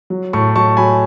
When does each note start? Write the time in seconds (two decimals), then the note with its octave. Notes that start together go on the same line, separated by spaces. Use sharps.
0.10 F#3
0.33 A2 A5 C#6
0.56 F#3 A5 C#6
0.77 F#3 G#5 B5